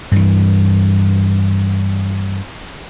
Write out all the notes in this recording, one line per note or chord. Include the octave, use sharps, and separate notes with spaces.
G2 E3